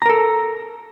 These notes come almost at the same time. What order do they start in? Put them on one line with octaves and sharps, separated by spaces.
A#5 A#4 A4